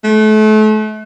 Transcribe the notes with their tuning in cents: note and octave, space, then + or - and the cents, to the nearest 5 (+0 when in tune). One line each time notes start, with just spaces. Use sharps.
A3 -35